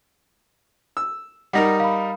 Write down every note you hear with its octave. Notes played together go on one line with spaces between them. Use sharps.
E6
G3 D#4 A#4 F#5 A#6
F5 B5